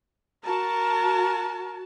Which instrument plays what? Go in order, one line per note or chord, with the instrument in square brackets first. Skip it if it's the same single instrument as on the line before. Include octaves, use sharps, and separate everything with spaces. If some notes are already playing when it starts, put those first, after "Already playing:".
[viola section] F#4 A5 [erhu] A#4